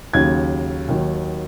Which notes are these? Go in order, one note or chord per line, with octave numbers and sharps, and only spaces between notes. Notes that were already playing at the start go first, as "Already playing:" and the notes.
D#2 C#3 F#3 G#6
D#2 D#3 F#3